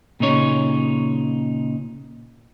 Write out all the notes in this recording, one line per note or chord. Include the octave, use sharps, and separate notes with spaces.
A#2 C#3 D#4 C#5